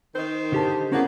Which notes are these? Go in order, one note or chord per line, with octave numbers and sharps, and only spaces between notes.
D#3 C5
D3 G4 A5
A#3 B3 C#4 E4 F#4 G#4